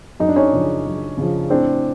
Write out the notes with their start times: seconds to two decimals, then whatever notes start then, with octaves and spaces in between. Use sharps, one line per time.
0.20 F#2 D#4
0.29 D4
0.36 C#4 D#4
0.53 C#3 F3
0.85 F#2
1.17 C#3 F3
1.50 A2 C4 D4